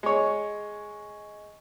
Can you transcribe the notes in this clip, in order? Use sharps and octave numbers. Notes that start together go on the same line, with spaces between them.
G#3 C#5